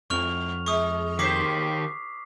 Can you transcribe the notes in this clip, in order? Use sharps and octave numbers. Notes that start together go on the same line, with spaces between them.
F2 G#2 C#6 F6 F7
G#3 C#6 D#6
D#3 E4 G4 C5 D6 B6 C7